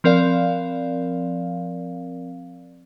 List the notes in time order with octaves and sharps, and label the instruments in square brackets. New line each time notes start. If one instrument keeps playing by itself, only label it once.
[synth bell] F3 C4 A#4 D5 F5